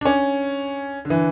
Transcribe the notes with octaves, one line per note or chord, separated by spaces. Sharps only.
D4
C#4
D3
E3